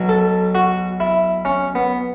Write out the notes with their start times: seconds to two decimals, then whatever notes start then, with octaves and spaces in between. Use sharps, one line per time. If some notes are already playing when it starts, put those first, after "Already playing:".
Already playing: B1 B2 F#3
0.09 A4
0.55 F#4
1.00 E4
1.45 C#4
1.75 B3